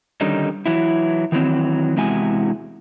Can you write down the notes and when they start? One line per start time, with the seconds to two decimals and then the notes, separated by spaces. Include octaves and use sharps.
0.21 D3 D#3 G3 C#4 D#4
0.66 E3 F#3 E4
1.32 D#3 E3 F#3 C4
1.97 E2 C3 G#3 E4 F#4 G#5